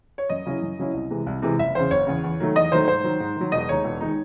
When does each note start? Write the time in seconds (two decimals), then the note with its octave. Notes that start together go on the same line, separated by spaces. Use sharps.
0.18 C#5
0.29 F#2 D#5
0.46 C#3 F#3 C#4 E4
0.62 F#2
0.78 C#3 F#3 C#4 E4
0.94 C2
1.10 C3 E3 G#3
1.26 C2
1.42 C3 E3 G#3
1.59 F#1 E5
1.75 E2 C#3 C5
1.91 F#1 C#5
2.07 E2 C#3
2.24 E2
2.40 D#3 F#3 A3
2.55 E2 D#5
2.72 D#3 F#3 A3 C5
2.87 G#2 C5
3.04 D#3 F#3
3.20 G#2
3.36 D#3 F#3
3.52 E1 D#5
3.69 D#2 D#3 G#3 D#4 C#5
3.84 E1
4.01 D#3 G#3 D#4